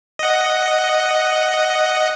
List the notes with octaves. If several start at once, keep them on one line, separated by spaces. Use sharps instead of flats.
D#5 F#5